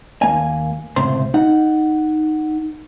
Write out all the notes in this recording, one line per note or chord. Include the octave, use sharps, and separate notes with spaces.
D#2 A#3 G#5
C#2 A2 C3 C5 C6
D#4 F#5